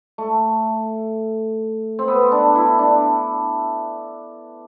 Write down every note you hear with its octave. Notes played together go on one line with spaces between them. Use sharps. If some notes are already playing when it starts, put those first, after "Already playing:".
A3
C4
B3
D4
E4
D4